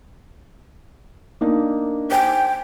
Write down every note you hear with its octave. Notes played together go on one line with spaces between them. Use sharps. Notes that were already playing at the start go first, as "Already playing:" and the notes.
A#3 D4 D#4
C5 G5 G#5